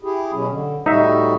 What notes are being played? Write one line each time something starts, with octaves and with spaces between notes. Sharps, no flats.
E4 G4 G#4
B2 F#3 C#4
D3
A2 G3 D#4 F#4 E5